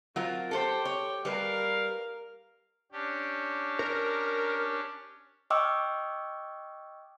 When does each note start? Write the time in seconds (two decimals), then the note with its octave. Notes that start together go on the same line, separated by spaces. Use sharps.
0.16 F#3 C4 F4 A#4
0.51 G4 A4 A#4 C5 G5
0.85 C#5
1.25 G3 A#4 B4 F5
2.92 C#4 D4 G4
3.79 A#4
5.50 D#5 G5 C#6 D6 E6 F6